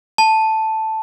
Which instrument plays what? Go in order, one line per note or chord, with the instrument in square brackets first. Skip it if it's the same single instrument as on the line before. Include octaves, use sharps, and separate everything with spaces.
[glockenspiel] A5